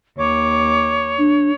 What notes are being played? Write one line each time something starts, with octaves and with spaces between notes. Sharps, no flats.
D#2 C#5 D6
D4